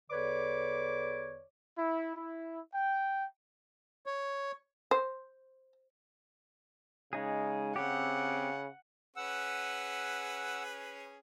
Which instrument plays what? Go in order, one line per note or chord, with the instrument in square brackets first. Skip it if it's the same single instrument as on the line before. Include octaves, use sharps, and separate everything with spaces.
[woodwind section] E2 D3 B4 C#5 D5 D6
[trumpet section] E4
E4
G5
[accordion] C#5
[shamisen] C5
[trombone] C#3 [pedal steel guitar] G#3 D#4 G#4
[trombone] C#3 [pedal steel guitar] C4 G4 [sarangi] F#5
[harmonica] C#4 G#4 B4 [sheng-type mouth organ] F#5 E6